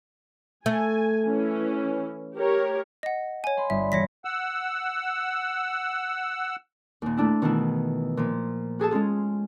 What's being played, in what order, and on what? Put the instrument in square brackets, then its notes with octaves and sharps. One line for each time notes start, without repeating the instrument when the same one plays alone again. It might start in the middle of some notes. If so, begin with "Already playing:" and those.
[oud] A3 [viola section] G#5
[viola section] E3 C#4
G4 A#4 C#5
[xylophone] D#5 F#5
C#5 G#5
[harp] B5 C6
[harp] G1 [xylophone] E5
[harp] E1 C#7 [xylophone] C#5 A#6 B6
[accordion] F#5 E6
[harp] D#2 A#2
A3 D4 E4
B2 D#3 E3 A3 E4
A#2 F3
F#4 G#4 A4 A5
G#3 C#4 F4 G#4